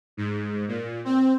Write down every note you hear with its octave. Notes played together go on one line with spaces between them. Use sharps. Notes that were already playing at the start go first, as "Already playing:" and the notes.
G#2
A#2
C4